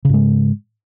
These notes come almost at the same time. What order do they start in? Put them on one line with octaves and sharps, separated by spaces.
C#3 G#2 G#3